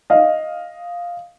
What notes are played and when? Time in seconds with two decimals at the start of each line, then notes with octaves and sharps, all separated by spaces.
0.10 D#5 F5